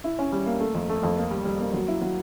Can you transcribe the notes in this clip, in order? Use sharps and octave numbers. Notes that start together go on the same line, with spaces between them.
E4
C#4
G3
A#3
A3
F2
A3
F2
A#3
G3
G3
A#3
F#3
E4
F#3